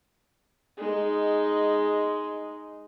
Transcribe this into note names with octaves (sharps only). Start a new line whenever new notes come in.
G#3 D#4